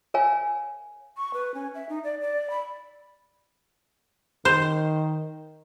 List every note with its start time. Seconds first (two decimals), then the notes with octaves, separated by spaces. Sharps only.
0.14 A#4 C#5 F5 G#5
1.17 C#6
1.34 B4
1.54 C#4
1.75 E5
1.89 D#4
2.04 D5
2.21 D5
2.50 B5
4.45 D#3 C5